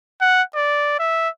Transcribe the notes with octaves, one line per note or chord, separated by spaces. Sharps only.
F#5
D5
E5